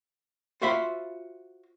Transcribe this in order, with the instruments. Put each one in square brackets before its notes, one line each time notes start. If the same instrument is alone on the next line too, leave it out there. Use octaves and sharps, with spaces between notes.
[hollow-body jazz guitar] F4 F#4 C5 E5 F5 B5